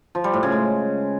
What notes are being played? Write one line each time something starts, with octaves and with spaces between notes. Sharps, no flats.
F3
G3
A2
C#3
G#3